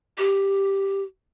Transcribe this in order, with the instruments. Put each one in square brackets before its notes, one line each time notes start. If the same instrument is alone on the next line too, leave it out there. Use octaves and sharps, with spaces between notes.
[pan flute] G4